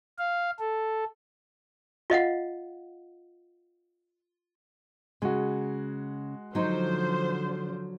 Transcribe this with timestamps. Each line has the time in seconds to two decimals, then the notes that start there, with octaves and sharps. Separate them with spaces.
0.19 F5
0.60 A4
2.10 F4 D#5 F5 F#5
5.22 C#3 G#3 F#4
6.55 D3 F3 F#3 D#4 C5